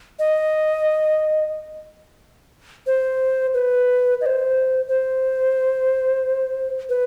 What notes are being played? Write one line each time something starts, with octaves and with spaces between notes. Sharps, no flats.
D#5
C5
B4
D#5
C5
C5
B4